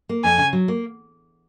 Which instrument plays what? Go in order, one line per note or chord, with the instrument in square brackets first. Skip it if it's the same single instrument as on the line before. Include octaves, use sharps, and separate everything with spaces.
[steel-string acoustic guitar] A#3
[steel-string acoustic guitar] F2 [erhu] G#5
[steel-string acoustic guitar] C#3
F#3
A#3